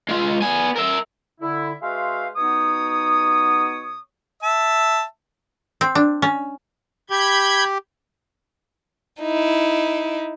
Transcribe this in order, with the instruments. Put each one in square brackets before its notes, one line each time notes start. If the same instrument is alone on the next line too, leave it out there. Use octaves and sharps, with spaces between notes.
[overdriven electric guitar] G#3 F4
B3 G#5
A#4 E5
[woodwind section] D3 E4
G#3 F#4 B4 C5 E5 F5
B2 B3 D#4 C#5 D#6
[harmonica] E5 A5
[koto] C4
D4
C#4
[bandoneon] G4 [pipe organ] B5 G6 G#6
[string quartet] D#4 E4